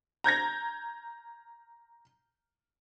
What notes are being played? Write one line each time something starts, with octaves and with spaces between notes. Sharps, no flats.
A#5 G6 G#6 A#6